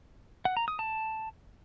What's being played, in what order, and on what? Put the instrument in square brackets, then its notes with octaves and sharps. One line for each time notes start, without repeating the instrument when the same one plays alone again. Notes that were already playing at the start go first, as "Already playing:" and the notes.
[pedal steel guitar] F#5
A#5
D#6
A5